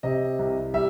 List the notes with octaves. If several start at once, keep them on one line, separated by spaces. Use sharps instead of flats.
C3 D#5
C2
G3 E5